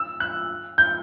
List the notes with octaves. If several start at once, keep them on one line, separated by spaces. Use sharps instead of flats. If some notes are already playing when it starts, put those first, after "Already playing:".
Already playing: E6
F#6
G6